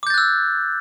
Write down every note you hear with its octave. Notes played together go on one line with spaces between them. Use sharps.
D6 E6 F#6 G6 A6